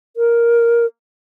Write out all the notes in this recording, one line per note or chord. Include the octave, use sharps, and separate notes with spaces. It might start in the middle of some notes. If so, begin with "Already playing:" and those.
A#4